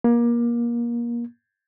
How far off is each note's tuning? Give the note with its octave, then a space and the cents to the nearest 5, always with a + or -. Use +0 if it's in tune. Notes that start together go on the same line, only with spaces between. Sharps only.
A#3 +25